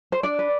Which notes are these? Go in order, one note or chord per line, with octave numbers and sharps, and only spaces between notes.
C5
D4 D5
B4